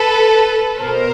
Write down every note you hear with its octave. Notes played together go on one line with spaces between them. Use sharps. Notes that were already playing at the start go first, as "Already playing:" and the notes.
Already playing: A4 B4
B2 A#4 C5